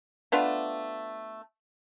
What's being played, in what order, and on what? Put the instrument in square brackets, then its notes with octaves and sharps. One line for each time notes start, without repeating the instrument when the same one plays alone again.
[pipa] A3 B3 D4 F4